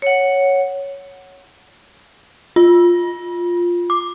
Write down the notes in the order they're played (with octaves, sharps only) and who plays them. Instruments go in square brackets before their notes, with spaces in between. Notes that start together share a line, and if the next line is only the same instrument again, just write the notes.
[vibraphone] C#5 F#5
[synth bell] F4
D6